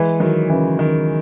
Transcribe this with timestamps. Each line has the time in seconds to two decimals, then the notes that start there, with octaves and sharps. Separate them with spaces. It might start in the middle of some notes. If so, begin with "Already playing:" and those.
Already playing: E3 G#3
0.20 D#3 F#3
0.50 C#3 E3
0.79 D#3